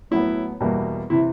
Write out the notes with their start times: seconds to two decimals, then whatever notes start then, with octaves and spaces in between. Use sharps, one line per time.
0.11 A2 F#3 B3 E4
0.60 E2 B2 G3 A#3
1.10 C3 E3 E4